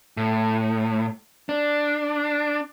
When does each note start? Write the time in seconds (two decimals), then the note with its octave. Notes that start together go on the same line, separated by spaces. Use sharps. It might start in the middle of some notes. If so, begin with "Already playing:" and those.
0.17 A2
1.49 D4